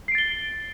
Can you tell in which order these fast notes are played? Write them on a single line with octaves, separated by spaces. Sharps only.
C7 D7 A6 G7